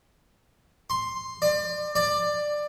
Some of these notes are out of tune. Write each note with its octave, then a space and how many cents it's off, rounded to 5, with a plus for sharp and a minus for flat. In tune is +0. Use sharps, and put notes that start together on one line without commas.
C6 +5
D5 +30
D5 +15